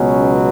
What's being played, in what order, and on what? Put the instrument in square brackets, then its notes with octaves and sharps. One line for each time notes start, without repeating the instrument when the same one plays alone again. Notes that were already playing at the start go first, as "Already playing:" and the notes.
Already playing: [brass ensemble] C#2 B2 F#3 B3 C#4